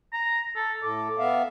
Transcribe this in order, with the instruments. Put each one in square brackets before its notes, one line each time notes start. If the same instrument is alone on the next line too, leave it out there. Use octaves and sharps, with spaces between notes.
[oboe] A#5
A4
[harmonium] A2 A4 [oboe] D6
[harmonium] B3 E5 F5